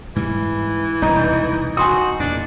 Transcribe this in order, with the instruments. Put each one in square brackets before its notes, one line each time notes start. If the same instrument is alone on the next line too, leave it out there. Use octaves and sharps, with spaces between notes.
[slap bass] G#2 G3 [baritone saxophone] E3
[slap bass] E1 C2 A2 [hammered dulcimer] D#4
[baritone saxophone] F#4 [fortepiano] G#5 C6 D#6
[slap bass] E2 A#2 [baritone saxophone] D4